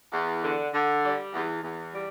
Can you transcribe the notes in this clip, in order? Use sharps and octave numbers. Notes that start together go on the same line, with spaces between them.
E2
D3
D3
G3
E2
E2
G3